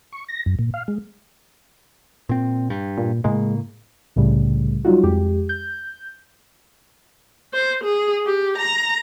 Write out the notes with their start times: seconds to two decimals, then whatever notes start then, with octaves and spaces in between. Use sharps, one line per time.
0.12 C#6
0.29 A#6
0.46 F#2
0.59 A#2
0.74 F5
0.88 G#3
2.29 A#2 C4
2.70 G2
2.98 A#2
3.24 A2 C#3 G#3 A#3
4.16 C2 A2 C#3 G3 A3
4.85 F#3 G3 D#4 F4 F#4
5.03 F2 G#3 G4
5.49 G6
7.54 C5
7.84 G#4
8.26 G4
8.58 A#5